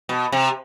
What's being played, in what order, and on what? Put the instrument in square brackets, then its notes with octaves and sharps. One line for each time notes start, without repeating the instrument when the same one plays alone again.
[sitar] B2
C3